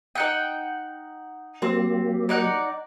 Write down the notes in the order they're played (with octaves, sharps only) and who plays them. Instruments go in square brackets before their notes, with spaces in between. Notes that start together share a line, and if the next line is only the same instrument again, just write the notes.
[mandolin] D#4 F#5 G5
[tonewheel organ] F#3 A#3 G4 [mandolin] C4
[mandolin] D#4 D5 F#5